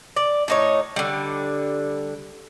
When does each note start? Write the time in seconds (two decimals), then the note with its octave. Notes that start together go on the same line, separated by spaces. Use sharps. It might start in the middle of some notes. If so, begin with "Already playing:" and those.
0.16 D5
0.48 A2 D#4 C#5
0.96 D3 G3